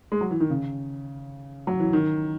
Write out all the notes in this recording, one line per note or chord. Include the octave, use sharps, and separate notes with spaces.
G#3
F#3
E3
D#3
C#3
F#3
E3
D#3